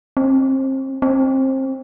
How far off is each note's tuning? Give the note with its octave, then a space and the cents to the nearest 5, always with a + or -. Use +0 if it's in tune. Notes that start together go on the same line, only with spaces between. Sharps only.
C4 +30
C4 +25